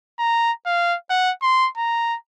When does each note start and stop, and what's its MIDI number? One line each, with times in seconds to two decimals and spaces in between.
0.19 0.52 82
0.66 0.96 77
1.10 1.32 78
1.42 1.69 84
1.77 2.16 82